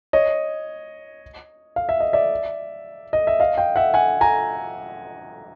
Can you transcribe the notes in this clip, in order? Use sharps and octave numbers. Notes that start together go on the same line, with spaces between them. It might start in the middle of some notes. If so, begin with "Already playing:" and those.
C#5 D#5
F5
E5
D#5
D5 E5
D#5
E5
D#5 F5
F5 G5
E5 F#5
F#5 G#5
G#5 A#5